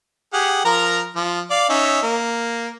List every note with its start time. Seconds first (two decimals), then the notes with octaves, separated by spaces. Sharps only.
0.33 G4 G#4 F#5
0.65 F3 A#4 A#5
1.16 F3
1.50 D5 F5
1.69 C#4 D#4 E5
2.02 A#3